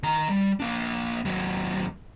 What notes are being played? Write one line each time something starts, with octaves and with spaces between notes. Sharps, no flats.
D#3 A#5
G3
A#3 D4
D#2 F#3